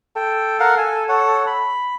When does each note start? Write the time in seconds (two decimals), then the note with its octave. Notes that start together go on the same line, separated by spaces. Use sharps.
0.16 A4 G5
0.60 A#4 F5 F#5
0.78 G#5
1.09 C#5 F#5
1.47 B5